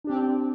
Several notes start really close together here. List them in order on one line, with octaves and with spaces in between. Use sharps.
D4 G4 C4